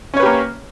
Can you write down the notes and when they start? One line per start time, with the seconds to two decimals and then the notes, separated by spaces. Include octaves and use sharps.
0.14 C#4
0.17 C#5
0.20 B4
0.23 G4
0.26 A#3